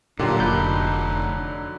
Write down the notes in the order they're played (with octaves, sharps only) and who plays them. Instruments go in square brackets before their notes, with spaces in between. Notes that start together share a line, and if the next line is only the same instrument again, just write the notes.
[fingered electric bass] A#2 [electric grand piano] D3 F#3 [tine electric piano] A#3 F4 G4 [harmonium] D4 D#4
[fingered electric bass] F1 [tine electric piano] B5 G6